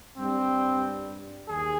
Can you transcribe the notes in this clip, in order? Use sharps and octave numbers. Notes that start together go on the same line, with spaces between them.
G2 G3 C4
D#2 G#4